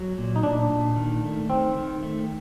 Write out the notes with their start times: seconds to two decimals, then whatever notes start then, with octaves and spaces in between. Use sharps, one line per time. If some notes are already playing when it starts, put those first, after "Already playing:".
Already playing: F#3
0.18 A#2
0.36 D#4
0.43 A#2 D4
0.70 A#2
0.96 D#3
1.24 A3
1.49 D#3 C4
1.77 D#3
2.03 A3